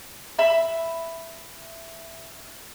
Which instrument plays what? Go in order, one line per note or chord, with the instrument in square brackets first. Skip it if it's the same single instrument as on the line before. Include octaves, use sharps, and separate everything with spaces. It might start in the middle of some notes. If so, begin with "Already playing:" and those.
[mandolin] E5 B5 E6